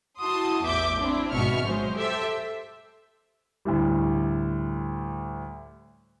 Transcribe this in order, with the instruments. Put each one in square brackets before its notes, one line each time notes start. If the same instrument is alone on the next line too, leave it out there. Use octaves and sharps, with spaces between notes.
[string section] E4 F#4 A5 C6 D#6
A1 E2 E5 D6 G6
C4 D4 E4
G#1 B2 E5 C#6 F6
F#3 G#3 C5
G4 A4 C5 E5
[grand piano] D2 A2 G3